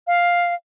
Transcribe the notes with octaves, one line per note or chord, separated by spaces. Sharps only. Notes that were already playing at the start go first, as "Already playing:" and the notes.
F5